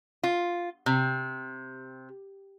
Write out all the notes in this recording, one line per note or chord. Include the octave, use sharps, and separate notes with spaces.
F4
C3